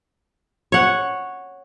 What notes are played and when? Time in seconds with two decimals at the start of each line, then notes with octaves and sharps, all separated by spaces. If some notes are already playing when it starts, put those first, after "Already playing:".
0.72 C#5 F#5